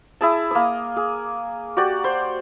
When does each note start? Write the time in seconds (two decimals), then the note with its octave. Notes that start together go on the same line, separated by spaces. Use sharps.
0.21 E4 G#4 A5
0.51 A#3 D#6
0.96 G#4
1.77 F#4 G4 D5
2.04 C5